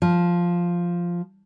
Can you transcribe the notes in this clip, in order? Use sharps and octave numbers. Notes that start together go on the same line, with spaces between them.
F3